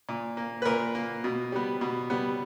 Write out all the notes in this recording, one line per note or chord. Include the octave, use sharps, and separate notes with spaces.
A#2
A#3
B4
A#2 A#4
A#3
B2
G3 B3
B2
G3 B3